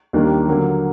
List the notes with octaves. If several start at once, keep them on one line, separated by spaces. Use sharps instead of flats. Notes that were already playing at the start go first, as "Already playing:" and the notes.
D#2 D#3 G3 A#3 D4
D3 F#3 A#3